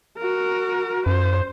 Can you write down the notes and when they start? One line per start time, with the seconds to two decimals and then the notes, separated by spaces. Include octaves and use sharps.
0.18 F#4 A#4
1.06 F#2 C5